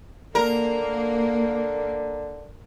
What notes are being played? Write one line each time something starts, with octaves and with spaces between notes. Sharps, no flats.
D3 A#3 A#4